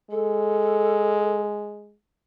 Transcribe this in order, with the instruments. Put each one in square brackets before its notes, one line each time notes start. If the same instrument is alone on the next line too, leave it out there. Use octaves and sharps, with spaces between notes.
[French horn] G#3 [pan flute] A4